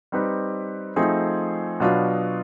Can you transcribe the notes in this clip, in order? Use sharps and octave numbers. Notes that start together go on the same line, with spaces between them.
G3 C4 D#4 G4 B4
F3 A3 C4 D#4 G#4
B2 F#3 B3 D4 F4